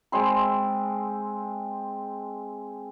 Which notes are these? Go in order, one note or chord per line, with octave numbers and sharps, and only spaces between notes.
G#3 C4 B5